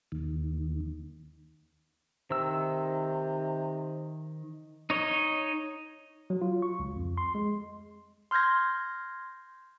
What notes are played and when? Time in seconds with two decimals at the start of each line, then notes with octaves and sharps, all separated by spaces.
0.12 D#2
2.31 C3 D#3 E6
4.90 D#4 C#5 D#5
6.30 F#3
6.42 F4
6.62 C#6
6.80 C#2
6.96 F2
7.18 C6
7.35 G#3
8.31 C6 F6 G6 G#6 A#6